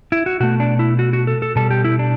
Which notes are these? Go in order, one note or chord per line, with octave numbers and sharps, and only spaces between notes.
E4
F#4
B2 A3 F#4
D4
E4
F#4
F#4
A4
A4
B2 G3 A4
G4
E4
D4